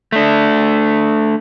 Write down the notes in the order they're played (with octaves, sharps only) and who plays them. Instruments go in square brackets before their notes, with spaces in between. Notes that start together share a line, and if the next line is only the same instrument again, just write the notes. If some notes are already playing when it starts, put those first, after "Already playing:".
[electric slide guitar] A3 D4